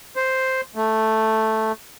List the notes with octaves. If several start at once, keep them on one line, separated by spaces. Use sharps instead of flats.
C5
A3